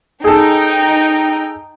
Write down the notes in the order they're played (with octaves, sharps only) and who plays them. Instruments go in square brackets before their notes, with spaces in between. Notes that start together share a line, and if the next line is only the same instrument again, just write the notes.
[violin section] D#4 G5 [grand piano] G#4 A4